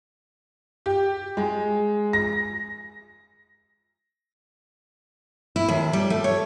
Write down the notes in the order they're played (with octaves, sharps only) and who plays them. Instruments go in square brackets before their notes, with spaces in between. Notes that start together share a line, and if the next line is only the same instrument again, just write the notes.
[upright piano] G4
G#3
A#6
[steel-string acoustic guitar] E4
D#2
G3
A3
C#5